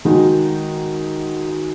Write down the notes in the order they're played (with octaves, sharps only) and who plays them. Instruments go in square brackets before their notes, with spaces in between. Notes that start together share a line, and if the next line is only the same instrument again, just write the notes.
[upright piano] D#3 G#3 D#4 F#4